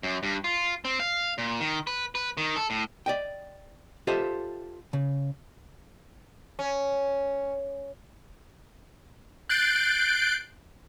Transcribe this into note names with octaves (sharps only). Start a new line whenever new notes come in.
F#2
G2
F4
C4
F5
A#2
D#3
B4
B4
D#3
A4
A2
D5 D#5 G5
F4 G4 A4 C5 D#5 E5
C#3
C#4
F#6 G6 A6 C7 D7